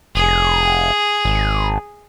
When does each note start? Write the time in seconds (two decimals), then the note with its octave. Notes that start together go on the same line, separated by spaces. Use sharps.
0.15 F1 G#4
1.25 G#1